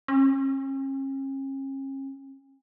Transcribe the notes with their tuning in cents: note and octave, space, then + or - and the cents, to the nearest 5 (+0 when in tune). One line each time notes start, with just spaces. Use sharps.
C#4 -40